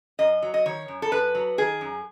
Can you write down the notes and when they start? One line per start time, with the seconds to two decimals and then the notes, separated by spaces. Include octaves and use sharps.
0.19 F#2 D#5
0.42 F#3
0.54 D#5
0.66 D#3 C#5
0.88 F#2
1.02 A4
1.11 F#2 B4
1.35 F#3
1.58 D#3 G#4
1.81 F#2